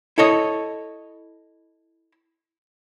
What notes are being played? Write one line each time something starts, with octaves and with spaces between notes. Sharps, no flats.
E4 A4 C#5 D#5